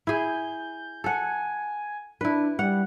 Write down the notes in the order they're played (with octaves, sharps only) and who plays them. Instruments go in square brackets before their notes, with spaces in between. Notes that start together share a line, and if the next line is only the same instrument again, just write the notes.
[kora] E4 G#4 [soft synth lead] G6
[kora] A4 F#5 [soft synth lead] G#5
[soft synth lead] D4 [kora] E4 B4
[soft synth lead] G3 [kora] F#5